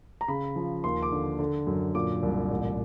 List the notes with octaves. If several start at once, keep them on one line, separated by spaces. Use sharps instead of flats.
A#5
C#3 B5
F3
D#2 C6
D6
D3
D3
F#2
A#2 D6
C2
A1